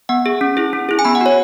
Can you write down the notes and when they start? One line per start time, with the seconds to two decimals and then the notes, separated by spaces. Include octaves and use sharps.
0.09 B3 F#5
0.26 G#4
0.41 C#4
0.57 E4 G#4
0.73 C#4
0.89 E4 G#4
0.99 G#5
1.05 B3 B5
1.15 F#5
1.21 F#4 C#5